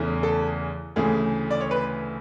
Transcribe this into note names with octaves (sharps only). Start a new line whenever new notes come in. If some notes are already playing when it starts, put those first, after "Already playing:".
Already playing: E2 C#3 E3 A3
A4
D2 C#3 E3 A3 G#4
D5
C#5
B4